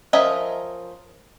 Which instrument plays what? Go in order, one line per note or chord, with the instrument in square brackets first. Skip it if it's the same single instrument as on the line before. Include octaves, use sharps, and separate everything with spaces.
[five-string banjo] F3 C#4 A#4 D#5 E5